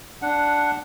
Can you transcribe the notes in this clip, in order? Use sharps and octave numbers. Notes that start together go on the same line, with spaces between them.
D4 F#5